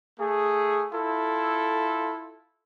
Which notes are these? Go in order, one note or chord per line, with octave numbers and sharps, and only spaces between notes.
A3 G#4
E4 F4 A4